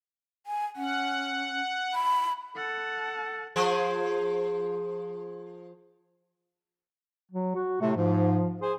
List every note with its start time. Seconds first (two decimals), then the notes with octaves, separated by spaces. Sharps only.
0.47 G#5
0.76 C#4 F#5
1.94 B5
2.56 A4 F#5 A5
3.56 F3 G#4 C5
7.31 F#3
7.55 F#4
7.81 A2 C3 A3
7.97 G#2 F3
8.62 G#4 C5